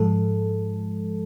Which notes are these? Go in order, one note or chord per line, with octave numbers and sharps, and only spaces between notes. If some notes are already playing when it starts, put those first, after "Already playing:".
Already playing: G#2 F3 G#3 A4